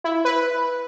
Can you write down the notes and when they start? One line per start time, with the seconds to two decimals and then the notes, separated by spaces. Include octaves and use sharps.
0.04 E4
0.25 B4